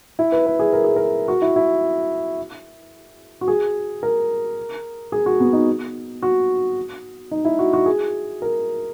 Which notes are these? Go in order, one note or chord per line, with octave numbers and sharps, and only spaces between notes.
E4
B4
B4
G#4
A#4
G#4
A#4
F#4
E4
E4
F#4
G#4
A#4
G#4
F#4
B3
D#4
F#4
D#4
E4
F#4
F#4
G#4
A#4